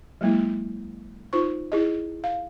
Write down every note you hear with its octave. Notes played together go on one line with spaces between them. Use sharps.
F#3 G#3 A#3 E4
D#4 F4 C5 C#6
E4 G#4 D#5
F5